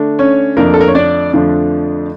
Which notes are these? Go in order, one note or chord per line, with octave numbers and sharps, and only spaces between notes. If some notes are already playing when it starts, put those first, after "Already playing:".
Already playing: D3 A3 D4
C#4 C#5
F2 D3 F3 A3 A#3 D4 A#4
A4
A#4
C#5
D4 D5
F2 D3 F3 A3 D4